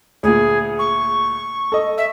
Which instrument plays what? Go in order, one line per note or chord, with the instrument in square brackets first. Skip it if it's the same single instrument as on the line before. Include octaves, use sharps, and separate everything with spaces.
[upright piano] D2 A#2 [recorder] G#4
[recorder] C#6
[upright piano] A4 D#5
[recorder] E5